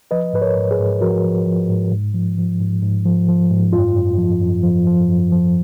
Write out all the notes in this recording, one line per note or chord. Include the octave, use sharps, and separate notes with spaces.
F3 B4 D#5
G#2 B4
A#4 C#5
G#2
G#4 B4
G#2
F3 F#4 A#4
F3
F3
G#2
G#2
F3
F3
G#2
G#2
F3
F3
G#2
F#2 F4
F#2
F3
F#2
F3
F3
F#2
F3